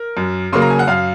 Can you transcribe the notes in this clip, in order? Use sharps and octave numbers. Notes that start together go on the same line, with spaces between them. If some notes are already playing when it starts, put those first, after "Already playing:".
Already playing: A#4
F#2
C#3 F#3 A#3 C6
A#5
G#5
F#5
F#2 F5